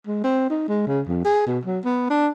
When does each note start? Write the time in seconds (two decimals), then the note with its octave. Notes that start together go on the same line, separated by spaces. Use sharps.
0.07 G#3
0.24 C4
0.50 D#4
0.69 G#3
0.87 C#3
1.08 F2
1.24 G#4
1.47 B2
1.65 F#3
1.85 B3
2.10 D4